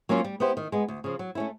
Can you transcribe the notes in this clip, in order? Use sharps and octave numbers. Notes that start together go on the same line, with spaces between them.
F#3 A#3 C#4 F4
G3
B3 E4 G4 C5
D#3
G#3 B3
D2
C#3 F3
F#3
A3 C#4 E4